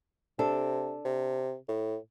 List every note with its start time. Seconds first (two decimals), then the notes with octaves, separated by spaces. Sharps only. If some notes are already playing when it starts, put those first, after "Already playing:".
0.39 C3 D4 A4
1.05 C3
1.68 A2